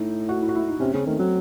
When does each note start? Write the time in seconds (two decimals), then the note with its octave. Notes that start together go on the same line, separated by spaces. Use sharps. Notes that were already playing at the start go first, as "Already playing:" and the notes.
Already playing: A2 D#4
0.29 F#4
0.42 E4
0.49 F#4
0.55 E4
0.68 D#4
0.80 C3 C#4
0.94 C#3 C4
1.06 D#3 A3
1.19 F#3 C4